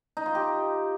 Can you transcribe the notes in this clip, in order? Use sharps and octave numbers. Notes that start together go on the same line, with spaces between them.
D#4
F4
G4